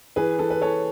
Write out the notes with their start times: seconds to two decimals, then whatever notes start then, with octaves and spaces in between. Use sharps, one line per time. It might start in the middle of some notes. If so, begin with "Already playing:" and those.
0.16 E3 G#4 B4
0.39 E3 A4
0.50 B4
0.62 E3 A4 C#5